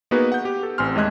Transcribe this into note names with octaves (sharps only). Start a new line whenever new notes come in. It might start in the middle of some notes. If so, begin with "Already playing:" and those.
A#3 B3 D#4 F#4 G#4 B4
F#5 G6
G4
A4
A1 C4 G#5 C6 F6
D#2 G#3 A3 D#5 F#6 G#6